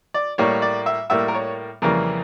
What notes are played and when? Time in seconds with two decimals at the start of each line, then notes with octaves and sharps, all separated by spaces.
0.14 D5
0.38 A2 G3 A#3 C#5
0.62 D5
0.86 E5
1.10 A2 G3 A#3 E5
1.28 A#4
1.34 C#5
1.82 F2 C#3 E3 G3 A#3 A#4